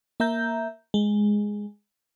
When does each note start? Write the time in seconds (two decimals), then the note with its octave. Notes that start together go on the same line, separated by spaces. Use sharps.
0.20 A#3 E5 A#5 G6
0.94 G#3